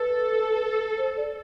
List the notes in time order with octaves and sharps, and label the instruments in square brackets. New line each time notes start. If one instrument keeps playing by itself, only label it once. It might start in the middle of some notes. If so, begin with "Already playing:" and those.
Already playing: [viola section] A4 [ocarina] B4
[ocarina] C5
D5